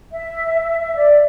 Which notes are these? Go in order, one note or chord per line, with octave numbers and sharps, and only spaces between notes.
E5
D5